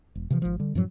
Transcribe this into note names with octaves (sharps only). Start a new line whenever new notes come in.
E1
C3 E3 F3
G#1 F3
D3 G3
F#2 A2 F3 F#3